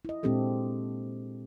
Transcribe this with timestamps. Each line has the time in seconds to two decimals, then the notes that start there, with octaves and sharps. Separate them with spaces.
0.05 E4 D#5
0.23 A#2 G#3 C4 D4 G4 A4